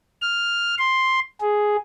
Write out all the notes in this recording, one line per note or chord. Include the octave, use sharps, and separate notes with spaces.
F6
C6
G#4